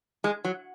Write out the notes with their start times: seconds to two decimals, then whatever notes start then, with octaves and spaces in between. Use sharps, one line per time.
0.24 G#3
0.44 F#3